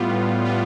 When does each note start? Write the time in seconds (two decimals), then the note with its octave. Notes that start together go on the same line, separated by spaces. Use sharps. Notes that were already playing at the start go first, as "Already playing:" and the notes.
Already playing: A2 G3 B3 F4
0.12 A2
0.45 G3 B3 F4